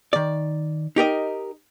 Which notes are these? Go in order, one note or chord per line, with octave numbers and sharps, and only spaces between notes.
D#3 D5
D#4 G4 A#4 D#5